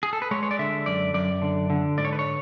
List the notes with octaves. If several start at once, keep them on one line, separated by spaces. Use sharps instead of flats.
G#4
A4
B4
G#3 C#5
C#5
D5
D3 E5
F#2 D5
F#2 D5
D3
D3
G#2 D5
C#5
B4
C#5